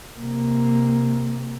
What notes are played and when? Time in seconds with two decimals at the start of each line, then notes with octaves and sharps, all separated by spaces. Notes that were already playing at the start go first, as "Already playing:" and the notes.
0.19 C3 A#3